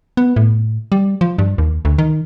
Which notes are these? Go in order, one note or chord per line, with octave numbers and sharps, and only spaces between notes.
B3
A2
G3
F3
G2
D#2
D2
D#3